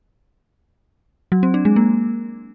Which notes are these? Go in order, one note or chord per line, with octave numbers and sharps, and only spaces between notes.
F#3
C4
D4
G#3
A#3